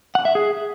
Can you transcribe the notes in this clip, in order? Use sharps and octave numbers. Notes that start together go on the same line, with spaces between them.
F#5
E5
G#4